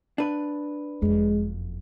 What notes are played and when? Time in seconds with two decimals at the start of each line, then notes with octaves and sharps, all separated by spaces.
0.18 D4 B4
1.02 F#1 F2 G#3